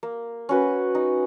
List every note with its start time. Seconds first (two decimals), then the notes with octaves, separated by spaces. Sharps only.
0.03 A#3
0.49 C#4 F#4 B4
0.95 D#4